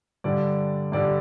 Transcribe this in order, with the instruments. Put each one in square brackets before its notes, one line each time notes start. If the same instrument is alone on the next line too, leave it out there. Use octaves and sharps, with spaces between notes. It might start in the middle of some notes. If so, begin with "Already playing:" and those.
[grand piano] G2 D3 G3 D5
G2 D3 G3 D5